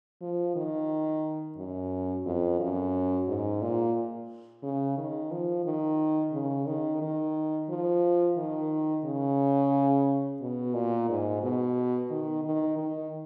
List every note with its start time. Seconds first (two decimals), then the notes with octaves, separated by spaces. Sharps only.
0.21 F3
0.56 D#3
1.57 F#2
2.25 F2
2.60 F#2
3.28 G#2
3.62 A#2
4.63 C#3
4.98 D#3
5.31 F3
5.66 D#3
6.33 C#3
6.66 D#3
7.01 D#3
7.69 F3
8.37 D#3
9.05 C#3
10.41 B2
10.74 A#2
11.09 G#2
11.43 B2
12.11 D#3
12.45 D#3
12.78 D#3